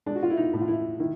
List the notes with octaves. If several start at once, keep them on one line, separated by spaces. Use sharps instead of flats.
G#3 D4
F#4
F4
E4
D#4
A2
F4
E4
D#3 E4